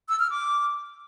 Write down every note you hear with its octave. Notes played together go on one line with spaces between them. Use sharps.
E6
F6
D6